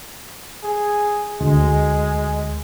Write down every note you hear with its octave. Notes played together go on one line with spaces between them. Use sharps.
G#4
D2 G#3